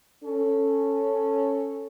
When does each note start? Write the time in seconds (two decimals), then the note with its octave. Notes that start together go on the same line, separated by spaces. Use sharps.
0.23 C#4 A4